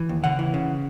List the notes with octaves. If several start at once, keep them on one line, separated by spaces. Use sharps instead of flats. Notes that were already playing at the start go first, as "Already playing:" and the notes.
Already playing: E3
D#2
C#3 F#5
E3
C#3